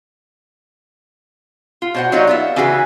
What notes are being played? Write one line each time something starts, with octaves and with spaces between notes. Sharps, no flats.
F4
B2 C5 F#5
F#3 G3 A#3 D#4 F4 F#4
B3 F4 E5
C#3 E3 F#4 G#4 B4